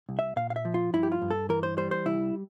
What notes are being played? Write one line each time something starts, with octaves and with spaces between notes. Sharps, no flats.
C2
E5
A#2 F5
F5
E5
F3
F4
G2 E4
G4
F4
G2
A4
E3 A#4
C5
G3 C5
C5
C2 E4